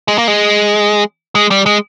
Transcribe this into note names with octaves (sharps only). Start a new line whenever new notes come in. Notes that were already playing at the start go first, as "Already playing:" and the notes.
G#3
A#3
G#3
G#3
G3
G#3